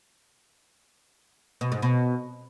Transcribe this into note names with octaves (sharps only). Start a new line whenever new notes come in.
B2
G#2
B2